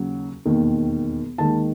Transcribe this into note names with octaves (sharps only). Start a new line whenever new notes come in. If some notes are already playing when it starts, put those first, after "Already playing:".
Already playing: D#2 C#3 F#3
E1 D#2 D#3
D#2 D#3 G#3 A5